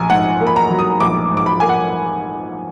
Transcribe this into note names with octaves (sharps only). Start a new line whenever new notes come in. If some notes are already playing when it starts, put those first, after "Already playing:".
Already playing: A#1 G#5 A#5
G#2 F#5
A#3
B5
A#5
F#3
D#6
A#1 D6
G#2
D6
B5
A#3 G#5
F#5